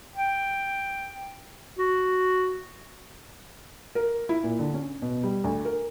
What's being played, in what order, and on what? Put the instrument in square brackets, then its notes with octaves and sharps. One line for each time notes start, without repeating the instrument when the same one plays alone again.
[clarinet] G5
F#4
[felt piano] A#4
E4
A#2
D3
C#4
B2
G3
D2
A#4